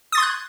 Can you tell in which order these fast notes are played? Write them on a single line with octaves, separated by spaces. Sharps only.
D#6 A6 C6 G#6 F#6